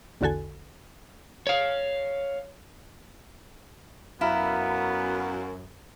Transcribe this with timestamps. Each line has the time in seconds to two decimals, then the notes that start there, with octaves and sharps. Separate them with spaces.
0.21 A#1 E2 D3 F#4 A4 G#5
1.47 C#5 F5
4.21 F#2 B3 E4 F5 A#5 F6